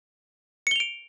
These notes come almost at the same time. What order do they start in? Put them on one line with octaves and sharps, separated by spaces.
C#7 G7 F7 D7